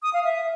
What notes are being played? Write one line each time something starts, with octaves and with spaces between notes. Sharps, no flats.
D#6
F5
E5